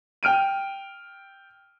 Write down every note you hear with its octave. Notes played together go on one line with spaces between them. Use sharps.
G5 F6 D7 D#7